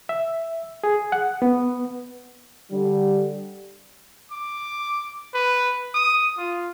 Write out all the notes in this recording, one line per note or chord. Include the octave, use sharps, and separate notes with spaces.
E5
G#4
F#5
B3
D3 G3
D6
B4
D#6
F4